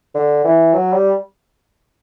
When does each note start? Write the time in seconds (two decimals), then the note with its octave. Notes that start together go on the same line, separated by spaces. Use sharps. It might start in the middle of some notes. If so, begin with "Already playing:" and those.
0.15 D3
0.44 E3
0.73 F#3
0.93 G3